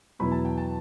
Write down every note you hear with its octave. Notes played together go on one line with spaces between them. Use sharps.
E2 B2 F#3 B3 E4 B5
A5
G5
A5